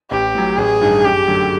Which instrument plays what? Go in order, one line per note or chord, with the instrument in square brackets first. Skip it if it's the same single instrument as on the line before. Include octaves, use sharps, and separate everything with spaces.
[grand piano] A1 [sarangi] G4
[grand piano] A2 F#3
[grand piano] A1 [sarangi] G#4
[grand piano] G2 D#3
[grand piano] F#2 [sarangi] G4
[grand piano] D3 F#3 A3